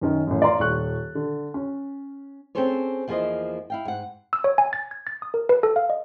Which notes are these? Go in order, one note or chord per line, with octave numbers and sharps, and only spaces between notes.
F#2 D#3 C#4
A1 F#2
D5 F5 A#5 C6
D#1 C#6 F#6
D3
C#4
C4 C#4 G#4 A4 C5 C#5
E2 F3 A#3 G#4 C5 D#5
E4 F5 G5
G#2 F#5
E6
C#5
G#5
A6
G#6
A6
D#6
A#4
B4
A4
F5
D#5